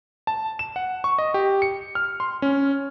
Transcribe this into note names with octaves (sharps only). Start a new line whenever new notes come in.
A5
E7
F#5
C#6
D#5
G4
C#7
F6
C6
C#4